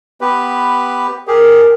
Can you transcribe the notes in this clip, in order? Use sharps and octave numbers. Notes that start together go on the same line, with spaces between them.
B3 G4 B4
G4 G#4 A#4